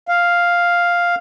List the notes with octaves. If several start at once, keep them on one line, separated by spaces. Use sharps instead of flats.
F5